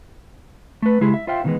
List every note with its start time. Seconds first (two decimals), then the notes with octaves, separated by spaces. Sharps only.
0.82 A3 B4
1.01 C#3 G#3 E4 G4 G#4
1.14 E5
1.27 F4 C5 E5 F5 G5
1.44 B2 D#3 E3 G3 G#3 B3